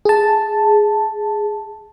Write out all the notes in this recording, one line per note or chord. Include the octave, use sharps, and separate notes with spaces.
G#4 A5